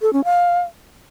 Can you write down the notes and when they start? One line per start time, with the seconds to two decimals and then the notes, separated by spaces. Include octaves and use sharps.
0.02 A4
0.13 C#4
0.24 F5